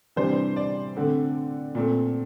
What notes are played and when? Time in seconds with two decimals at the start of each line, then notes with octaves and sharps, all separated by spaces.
0.16 C3 E3 G3 D4 C5
0.56 D5
0.97 D3 A3 C4
1.75 A#2 A3 C4